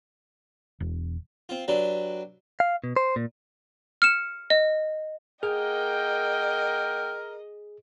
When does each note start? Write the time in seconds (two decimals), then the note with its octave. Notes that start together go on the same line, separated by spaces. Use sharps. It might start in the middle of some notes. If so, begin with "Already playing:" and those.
0.80 E1
1.49 C4 F4
1.68 F#3 D4 G4 B4 E5
2.60 F5
2.84 B2
2.96 C5
3.16 A#2
4.02 F6 C#7 E7
4.50 D#5
5.43 A#3 G#4 A#4 D#5 F#5 G5